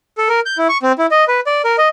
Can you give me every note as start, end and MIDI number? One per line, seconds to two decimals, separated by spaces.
0.18 0.29 69
0.29 0.40 70
0.46 0.57 91
0.58 0.67 64
0.69 0.78 85
0.83 0.92 60
0.98 1.06 64
1.11 1.24 75
1.28 1.40 71
1.47 1.62 74
1.65 1.76 70
1.78 1.89 75